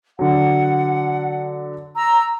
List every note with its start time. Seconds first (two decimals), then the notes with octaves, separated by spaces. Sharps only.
0.19 D3 F#3 F#5
1.96 A#5 E6